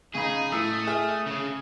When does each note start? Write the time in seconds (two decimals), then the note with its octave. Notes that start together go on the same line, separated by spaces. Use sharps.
0.15 C#3 D#4 G#4 B5
0.52 A2 A3 D#6 E6
0.87 G#4 E5 F6
1.27 C#3